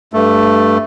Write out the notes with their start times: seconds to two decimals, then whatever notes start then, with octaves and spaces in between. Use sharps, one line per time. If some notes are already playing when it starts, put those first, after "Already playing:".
0.13 G2 A3